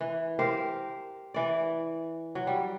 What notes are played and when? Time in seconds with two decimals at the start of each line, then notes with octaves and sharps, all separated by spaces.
0.01 E3
0.39 G4 A#4 C5 F5
1.34 E3 D5
2.35 F#3
2.47 G3